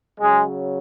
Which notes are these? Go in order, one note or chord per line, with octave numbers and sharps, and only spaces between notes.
C#3 F#3 G#3